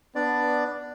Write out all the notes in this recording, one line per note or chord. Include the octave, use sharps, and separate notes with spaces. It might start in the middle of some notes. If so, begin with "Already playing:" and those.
B3 D4 D5